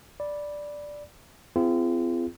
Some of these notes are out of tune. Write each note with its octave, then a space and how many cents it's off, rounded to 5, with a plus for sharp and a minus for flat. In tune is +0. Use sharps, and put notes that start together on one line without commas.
D5 +0 B5 -10
C4 -30 F4 -40 G#4 +0